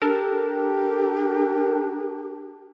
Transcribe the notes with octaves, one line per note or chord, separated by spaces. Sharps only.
D4 G4 A4 A#4